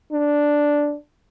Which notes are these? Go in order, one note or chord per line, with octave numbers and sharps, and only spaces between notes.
D4